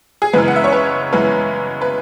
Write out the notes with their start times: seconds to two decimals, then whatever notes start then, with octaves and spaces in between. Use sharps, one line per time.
0.22 G#4
0.33 F#2 C#3 E3 G#3 B3 B4
0.48 F#5
0.56 E5
0.64 C#5
0.72 B4
1.12 F#2 C#3 E3 G#3 B3 B4
1.82 B4